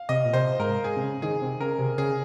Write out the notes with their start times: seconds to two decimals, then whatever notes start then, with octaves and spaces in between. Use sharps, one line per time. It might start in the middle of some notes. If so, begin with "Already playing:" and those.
Already playing: F5
0.09 C3 D#5
0.25 A#2
0.33 C3 C5
0.59 G#2 A#4
0.84 G#4
0.96 C3
1.03 C#3
1.22 D#3 G#4
1.42 C3
1.60 C#3 A#4
1.79 C3
1.98 C#3 G#4